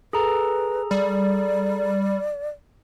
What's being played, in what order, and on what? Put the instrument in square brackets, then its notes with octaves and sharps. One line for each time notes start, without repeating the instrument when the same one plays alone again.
[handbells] G#4 A4 A#5 [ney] B4
[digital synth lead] G3 [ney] D5